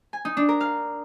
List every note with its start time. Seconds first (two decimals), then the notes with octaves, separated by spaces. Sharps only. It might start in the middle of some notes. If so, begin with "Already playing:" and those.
0.13 G#5
0.25 D#4
0.37 D4
0.49 A#4
0.60 F5